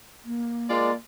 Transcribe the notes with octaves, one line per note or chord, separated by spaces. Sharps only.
A#3
G#3 F4 A#4 D5